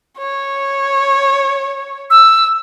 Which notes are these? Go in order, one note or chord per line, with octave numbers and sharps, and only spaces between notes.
C#5
E6